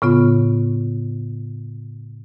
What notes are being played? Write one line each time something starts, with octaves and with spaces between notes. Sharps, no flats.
A2 C#3 B3 F4